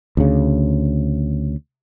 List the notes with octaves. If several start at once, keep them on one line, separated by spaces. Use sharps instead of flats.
D2 C#3